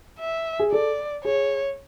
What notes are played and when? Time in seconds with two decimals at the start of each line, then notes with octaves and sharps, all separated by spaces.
0.19 E5
0.59 G#4
0.72 A4 D5
1.24 G#4 C#5